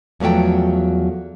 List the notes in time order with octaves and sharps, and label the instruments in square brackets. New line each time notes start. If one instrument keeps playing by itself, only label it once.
[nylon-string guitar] E2 F3 F#3 A3 G5